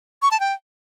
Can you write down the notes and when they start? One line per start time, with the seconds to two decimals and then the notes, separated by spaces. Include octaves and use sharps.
0.22 C#6
0.31 A5
0.40 G5